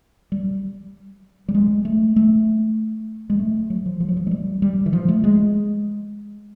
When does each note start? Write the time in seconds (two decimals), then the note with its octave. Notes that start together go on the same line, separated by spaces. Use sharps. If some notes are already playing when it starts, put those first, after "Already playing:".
0.32 G3
1.48 G3
1.55 G#3
1.85 A3
2.16 A3
3.30 G#3
3.39 A3
3.70 F#3
3.86 F3
4.00 F3
4.08 F#3
4.17 F3
4.27 G#3
4.31 G3
4.62 G3
4.86 E3
4.93 F3
5.08 A3
5.24 G#3